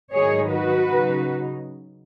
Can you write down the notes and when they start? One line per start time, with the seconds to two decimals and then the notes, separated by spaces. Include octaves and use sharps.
0.13 G#2 D#3 F#3 D#4 G#4 C#5
0.50 F#4 B4
0.87 C#3 F#3 D#4